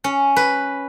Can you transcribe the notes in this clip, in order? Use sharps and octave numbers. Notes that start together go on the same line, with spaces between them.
C#4
B4